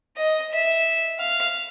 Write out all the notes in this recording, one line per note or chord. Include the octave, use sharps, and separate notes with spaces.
D#5
E5
F5